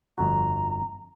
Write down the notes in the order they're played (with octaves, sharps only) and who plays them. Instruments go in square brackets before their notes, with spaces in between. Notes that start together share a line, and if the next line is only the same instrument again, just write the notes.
[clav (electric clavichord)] G1 F2 F#4 [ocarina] A#5